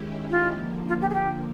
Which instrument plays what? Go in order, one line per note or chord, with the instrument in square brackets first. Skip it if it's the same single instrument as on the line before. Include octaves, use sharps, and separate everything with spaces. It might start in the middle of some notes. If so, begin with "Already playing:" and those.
Already playing: [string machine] D#3 G#3 C#4 E4 G4
[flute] F4
[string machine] D3 F3 A#3
[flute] F4
G4
G#4
G4